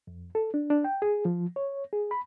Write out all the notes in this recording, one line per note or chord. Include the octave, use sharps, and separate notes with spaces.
F2
A4
D4
D4
G5
G#4
F3
C#5
G#4
B5